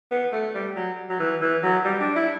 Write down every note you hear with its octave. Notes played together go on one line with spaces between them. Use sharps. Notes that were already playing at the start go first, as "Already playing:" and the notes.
B3
A3
G3
F#3
F#3
E3
E3
F#3
G3
D4
E4